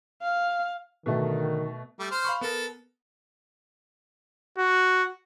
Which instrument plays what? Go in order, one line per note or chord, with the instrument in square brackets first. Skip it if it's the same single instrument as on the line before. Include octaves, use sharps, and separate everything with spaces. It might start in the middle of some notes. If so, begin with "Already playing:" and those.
[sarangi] F5
[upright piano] B2 A3 [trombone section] D3 D#3
[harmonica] G3 A3
C5 F6
[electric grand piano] F5 B5 C#6
[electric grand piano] B3 A#4 [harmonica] A4
[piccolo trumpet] F#4